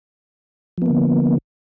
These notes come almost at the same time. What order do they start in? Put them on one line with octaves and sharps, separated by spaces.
F3 B3 A#3 D3